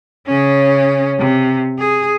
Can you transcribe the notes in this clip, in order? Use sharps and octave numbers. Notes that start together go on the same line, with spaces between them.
C#3 C#4
C3
G#4